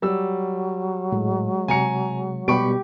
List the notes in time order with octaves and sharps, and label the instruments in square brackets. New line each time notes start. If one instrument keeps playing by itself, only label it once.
[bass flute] F#3 [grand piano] G3 E6
[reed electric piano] A2 [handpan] G#3
[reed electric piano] C3 [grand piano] G#5 A#5 C#7
[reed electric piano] B2 G3 B3 [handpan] G4 [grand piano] B5 C#6 D7